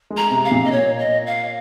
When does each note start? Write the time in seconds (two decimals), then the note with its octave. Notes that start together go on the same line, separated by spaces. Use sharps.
0.10 G#3
0.17 A#5
0.31 C3
0.45 F5
0.51 A#2
0.64 D#5
0.71 C#5
0.99 D#5
1.26 F5